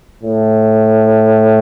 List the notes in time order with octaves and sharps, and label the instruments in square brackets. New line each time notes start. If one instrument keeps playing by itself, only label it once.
[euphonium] A2